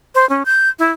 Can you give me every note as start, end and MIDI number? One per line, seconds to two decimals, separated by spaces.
0.15 0.28 72
0.30 0.43 61
0.46 0.68 91
0.79 0.91 64